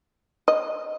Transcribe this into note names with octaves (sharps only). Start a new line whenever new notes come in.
D#5